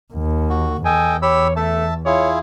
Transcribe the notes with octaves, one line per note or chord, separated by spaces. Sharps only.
D#2
F#4
E2 A4 D#5 G5 G#5
G4 C#5 B5 E6
A3 E5 A5
E4 F4 G#4 C#5